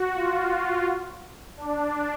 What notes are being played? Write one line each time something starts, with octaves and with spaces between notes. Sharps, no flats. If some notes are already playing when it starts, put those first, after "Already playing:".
Already playing: F#4
F4
D4